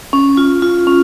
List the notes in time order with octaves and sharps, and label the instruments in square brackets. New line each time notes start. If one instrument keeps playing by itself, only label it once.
[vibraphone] C#4
F4
F4
C#4